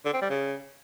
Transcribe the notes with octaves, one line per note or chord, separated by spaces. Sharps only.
D3
C4
G3
C#3